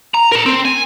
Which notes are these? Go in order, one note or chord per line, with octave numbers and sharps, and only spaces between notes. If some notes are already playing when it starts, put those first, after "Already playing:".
A#5
A#4 A5
C4
G#5